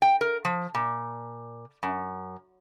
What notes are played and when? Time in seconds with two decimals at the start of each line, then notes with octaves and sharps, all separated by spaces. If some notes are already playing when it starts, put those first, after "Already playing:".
0.02 G5
0.21 A#4
0.45 F3
0.75 A#2
1.83 F#2